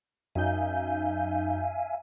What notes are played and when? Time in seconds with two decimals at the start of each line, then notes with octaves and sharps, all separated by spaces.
0.35 F#2 D#4 E5 F5 G#5 G6